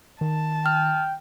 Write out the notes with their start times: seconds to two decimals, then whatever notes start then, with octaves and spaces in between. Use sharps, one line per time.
0.21 D#3 A5
0.66 G5 F6